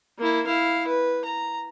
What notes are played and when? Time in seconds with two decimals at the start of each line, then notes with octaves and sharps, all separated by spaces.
0.18 A#3 E4
0.47 E4 F5
0.88 B4
1.25 A#5